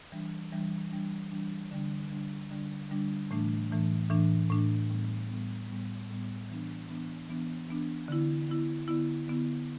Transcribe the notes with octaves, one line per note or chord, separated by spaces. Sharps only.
E3 G3 D4
E3 G3 D4
E3 G3 D4
E3 G3 D4
D3 G3 D4
D3 G3 D4
D3 G3 D4
D3 G3 D4
A2 E3 A3 D4
A2 E3 A3 D4
A2 E3 A3 D4
A2 E3 A3 D4
A2 G3 B3
A2 G3 B3
A2 G3 B3
A2 G3 B3
E3 B3 D4
E3 B3 D4
E3 B3 D4
E3 B3 D4
D3 B3 E4
D3 B3 E4
D3 B3 E4
D3 B3 E4